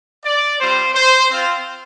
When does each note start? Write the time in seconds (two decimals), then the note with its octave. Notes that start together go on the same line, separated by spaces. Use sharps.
0.24 D5
0.60 G3 C4 F4 C5
0.94 C5
1.30 C4 F4